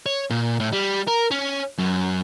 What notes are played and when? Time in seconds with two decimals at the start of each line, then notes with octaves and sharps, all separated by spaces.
0.06 C#5
0.30 A#2
0.60 A2
0.72 G3
1.07 A#4
1.31 C#4
1.78 F#2